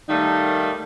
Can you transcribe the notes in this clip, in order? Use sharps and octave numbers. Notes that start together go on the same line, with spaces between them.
D#3 G3 A3 A#3 D#4